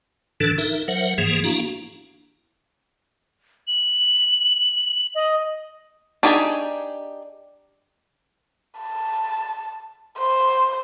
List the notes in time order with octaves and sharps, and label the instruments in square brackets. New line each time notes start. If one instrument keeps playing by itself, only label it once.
[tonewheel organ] A2 D3 E3 D4 A4
D#4 A#4 E5
F#3 A#4 C5 E5 F#5
G#2 E3 F3 A#3 G#4
A#3 D4 E4 F#4 F5 A#5
[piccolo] F#7
D#5
[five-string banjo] D4 D#4 G4 G#4 G#5
[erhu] A5
C5